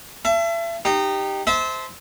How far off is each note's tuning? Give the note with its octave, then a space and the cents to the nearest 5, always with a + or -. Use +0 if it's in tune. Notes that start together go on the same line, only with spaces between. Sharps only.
E5 +35 A5 +0
D#4 -25 G4 +0
C5 -10 E5 -30 A5 -15